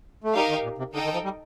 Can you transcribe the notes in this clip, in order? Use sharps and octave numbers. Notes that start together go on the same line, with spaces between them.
A3
G3 D#4 G4 A#4 F5
D#3
A#2
C3
D3 D#4 A4 D#5 G5
D#3
F3
G3